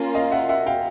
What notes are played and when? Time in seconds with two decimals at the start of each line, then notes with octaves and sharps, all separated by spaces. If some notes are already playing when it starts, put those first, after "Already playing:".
Already playing: A#3 C#4 F4
0.15 D#5 F5
0.32 E5 F#5
0.49 E5 F#5
0.66 F5 G5